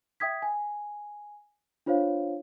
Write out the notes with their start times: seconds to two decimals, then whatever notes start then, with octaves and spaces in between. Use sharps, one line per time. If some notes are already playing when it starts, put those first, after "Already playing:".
0.20 E5 G5 D#6 G#6 B6
0.42 G#5
1.86 D4 F4 C5 C#5 F5